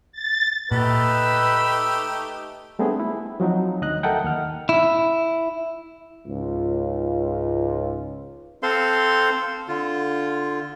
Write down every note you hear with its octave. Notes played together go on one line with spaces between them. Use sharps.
A6
A#2 A3 D#4 G4 B4 E6
G3 A3 B3 C4 D4 G#4
E4
F3 F#3 C4 D#4
D2 D#5 F#6
A4 A#4 D#5 E5 F#5 G5
D#2 F#5 F6
E4
C#2 G#2 F4
C4 A4 C5 F5 C6
D3 F4